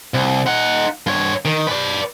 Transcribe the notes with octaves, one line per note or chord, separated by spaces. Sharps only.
C2
D#4 F#5
G2 C#5
D#3
B4 D5